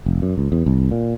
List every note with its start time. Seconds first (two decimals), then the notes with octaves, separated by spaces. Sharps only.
0.06 F1
0.22 F#2
0.38 C#2
0.52 E2
0.66 C2
0.91 A#2